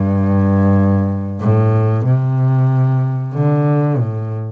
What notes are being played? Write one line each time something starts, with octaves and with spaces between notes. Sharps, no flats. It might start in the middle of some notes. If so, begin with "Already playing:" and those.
Already playing: G2
A2
C3
D3
A2